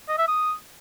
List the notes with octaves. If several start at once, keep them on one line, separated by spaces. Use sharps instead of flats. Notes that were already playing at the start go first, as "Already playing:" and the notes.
D#5
E5
D#6